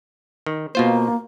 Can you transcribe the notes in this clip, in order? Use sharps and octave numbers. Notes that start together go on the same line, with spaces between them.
D#3
B2 A#3 F4 C5